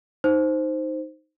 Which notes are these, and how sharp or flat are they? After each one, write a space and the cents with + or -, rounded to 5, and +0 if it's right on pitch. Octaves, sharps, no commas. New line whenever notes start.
D#4 +0 C5 +0